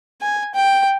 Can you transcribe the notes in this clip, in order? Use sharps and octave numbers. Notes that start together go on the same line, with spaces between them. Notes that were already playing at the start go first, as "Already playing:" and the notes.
G#5
G5